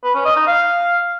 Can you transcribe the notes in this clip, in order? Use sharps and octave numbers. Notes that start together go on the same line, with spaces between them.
B4
C#4
D#5
D#4
F5